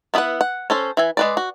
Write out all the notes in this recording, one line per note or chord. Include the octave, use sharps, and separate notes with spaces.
B3 E4 G#4 B4 F#5
F#5
C#4 A4 C5
E3 E5 G#5
G#3 B4 D5
F#4